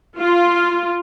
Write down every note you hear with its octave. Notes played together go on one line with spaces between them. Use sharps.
F4